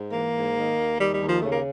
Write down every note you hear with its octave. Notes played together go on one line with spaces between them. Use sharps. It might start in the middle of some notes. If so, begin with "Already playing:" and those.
Already playing: G#2
E3 A#3
G#2
D#3
D#2
D#3 G3
G3
D#2
F3
C#3 A3
A#3